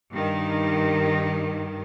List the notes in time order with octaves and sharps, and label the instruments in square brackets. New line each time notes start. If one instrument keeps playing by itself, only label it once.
[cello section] G2 D#3